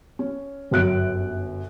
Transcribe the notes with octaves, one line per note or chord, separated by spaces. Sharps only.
C#4
G1 F#2 F#6 D7